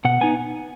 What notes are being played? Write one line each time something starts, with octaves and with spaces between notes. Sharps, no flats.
B2 F#5
B3 D#4 G#5